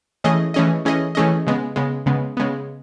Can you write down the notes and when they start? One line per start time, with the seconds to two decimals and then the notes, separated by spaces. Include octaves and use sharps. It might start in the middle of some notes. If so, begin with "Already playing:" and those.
0.24 E3 A3 C#4 G#4 D#5
0.54 E3 A3 C#4 G#4 D#5
0.85 E3 A3 C#4 G#4 D#5
1.15 E3 A3 C#4 G#4 D#5
1.47 C#3 G#3 B3
1.76 C#3 G#3 B3
2.06 C#3 G#3 B3
2.37 C#3 G#3 B3